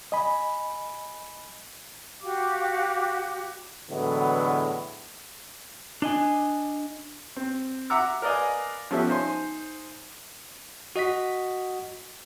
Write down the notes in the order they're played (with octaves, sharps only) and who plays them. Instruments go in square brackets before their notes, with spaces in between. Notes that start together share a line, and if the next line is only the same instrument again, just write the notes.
[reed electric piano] D#5 G#5 B5
[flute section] F#4 G4 F5 D6
[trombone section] A2 D3 E3 F#3 G#3 B3
[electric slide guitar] D4 D#5 G#5
[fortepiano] C4
E5 F#5 A#5 D6 E6
A#4 B4 D5 D#5 F5 G#5
F3 B3 C#4 G4 A4 E5
D#4 C5 G#5 C6
[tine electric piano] F#4 D#5 F#5 B6